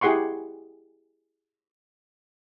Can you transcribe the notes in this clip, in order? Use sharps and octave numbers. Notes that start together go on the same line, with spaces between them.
E4 G4 G#4 F#5 C6 C#6